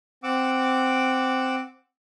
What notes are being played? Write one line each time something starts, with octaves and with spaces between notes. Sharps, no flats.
C4 F#5 D6 E6